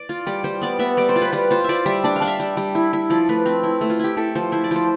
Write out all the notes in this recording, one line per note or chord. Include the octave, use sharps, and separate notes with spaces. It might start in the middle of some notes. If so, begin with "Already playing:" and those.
Already playing: D5
F4
G3 D5
G3 C5
B3 D5
B3 E5
G3 D5
C5
F4
B4
G3 B4
F4 C5
F4 D5 E5
G3 E5
D4 D5
F5
D4
E5
G3
G3
E4
E4
F3 D5
A3 B4
C4
E4
A3
F4
E4 G4
E4 A4
F3 C5
E4 C5
D5
F3 C5